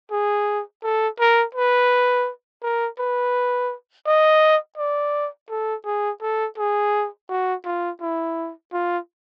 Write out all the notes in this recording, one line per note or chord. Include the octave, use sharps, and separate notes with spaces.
G#4
A4
A#4
B4
A#4
B4
D#5
D5
A4
G#4
A4
G#4
F#4
F4
E4
F4